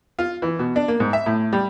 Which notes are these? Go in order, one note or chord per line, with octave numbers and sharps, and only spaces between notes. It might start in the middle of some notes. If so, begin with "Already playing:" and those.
F4
E3
B2
D4
A#3
G#2
E5
A2
G3